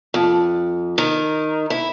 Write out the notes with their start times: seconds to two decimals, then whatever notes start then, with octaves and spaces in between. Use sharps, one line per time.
0.14 F2
0.98 D#3
1.70 E4